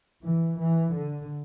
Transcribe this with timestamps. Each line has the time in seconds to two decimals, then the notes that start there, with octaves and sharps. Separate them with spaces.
0.23 E3
0.58 E3
0.94 D3